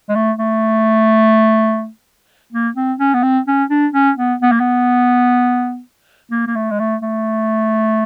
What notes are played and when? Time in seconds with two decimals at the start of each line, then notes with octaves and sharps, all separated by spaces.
0.10 G#3
0.16 A3
0.39 A3
2.53 A#3
2.77 C4
3.00 C#4
3.14 B3
3.23 C4
3.48 C#4
3.70 D4
3.94 C#4
4.18 B3
4.43 B3
4.52 A#3
4.60 B3
6.31 A#3
6.47 A#3
6.56 A3
6.71 G#3
6.79 A3
7.02 A3